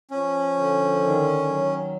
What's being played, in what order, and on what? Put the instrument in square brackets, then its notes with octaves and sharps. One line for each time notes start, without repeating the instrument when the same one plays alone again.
[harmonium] F3 [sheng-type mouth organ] C#4
[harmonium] D3
D#3
F#3